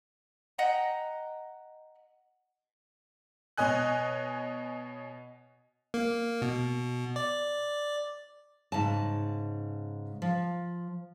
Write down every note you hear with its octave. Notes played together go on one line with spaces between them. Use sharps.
D#5 F#5 G5 A#5
B2 C#5 D#5 G#5 F#6
A#3
B2
D5
G#2 C#3 A5
F3